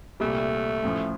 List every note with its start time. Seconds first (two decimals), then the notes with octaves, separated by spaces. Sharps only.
0.20 C2 A#2 G3 A3
0.84 A1 A2 F3